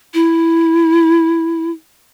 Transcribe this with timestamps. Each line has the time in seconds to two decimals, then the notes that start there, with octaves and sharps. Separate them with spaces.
0.14 E4